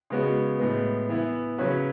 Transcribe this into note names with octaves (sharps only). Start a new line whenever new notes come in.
C#3 G#3 B3 F#4
A2 G#3 B3
E3 B3 E4
C#3 F#3 C#4 F#4 B4